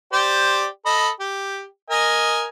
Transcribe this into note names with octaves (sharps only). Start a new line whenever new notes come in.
G4 C5 D5
A4 D#5 B5
G4
A#4 D#5 G#5